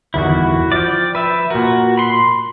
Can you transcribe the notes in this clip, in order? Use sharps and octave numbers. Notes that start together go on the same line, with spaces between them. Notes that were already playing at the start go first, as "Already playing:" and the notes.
G1 E2 D#3 E4 F#4
F3 D5 G5
B4 E5
A#2 F#4 A#4
B5 C6